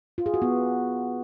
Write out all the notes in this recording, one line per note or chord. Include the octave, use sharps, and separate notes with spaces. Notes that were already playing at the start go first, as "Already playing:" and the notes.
F4
G#4
F#4
B3